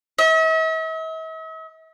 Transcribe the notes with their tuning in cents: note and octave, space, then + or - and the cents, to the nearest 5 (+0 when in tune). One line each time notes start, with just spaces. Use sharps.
E5 -45